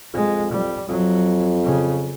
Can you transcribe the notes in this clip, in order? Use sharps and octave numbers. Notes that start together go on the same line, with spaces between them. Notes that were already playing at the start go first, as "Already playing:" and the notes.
F2 G#3
G3
F2 F#3
C#3